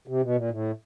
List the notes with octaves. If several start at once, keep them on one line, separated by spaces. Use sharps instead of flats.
C3
B2
A#2
A2